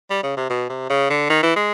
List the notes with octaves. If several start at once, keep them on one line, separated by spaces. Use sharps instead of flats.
G3
C#3
C3
B2
C3
C#3
D3
D#3
E3
G#3